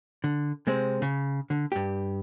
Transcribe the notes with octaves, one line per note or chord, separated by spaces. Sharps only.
D3
C3 G#3 C4
C#3
D3
G2 G4